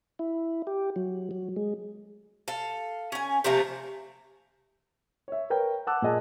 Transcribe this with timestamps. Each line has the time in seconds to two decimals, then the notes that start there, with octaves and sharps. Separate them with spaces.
0.19 E4
0.67 G4
0.96 F#3
1.31 F#3
1.56 G#3
2.48 A4 F5
3.12 C#4 G#5
3.44 C3 F3 A3 A#3
5.28 C#5 E5
5.50 A#4 B4 C#5 G5
5.87 F#5 A5 D6 E6 F#6
6.02 A#2 G#4 D#5 A5